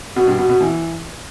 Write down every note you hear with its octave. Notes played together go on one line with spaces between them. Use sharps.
B2
G2
B2
B2
E3